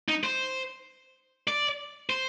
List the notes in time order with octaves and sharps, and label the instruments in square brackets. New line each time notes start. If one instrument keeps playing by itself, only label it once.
[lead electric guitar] D#4
C5
D5
C5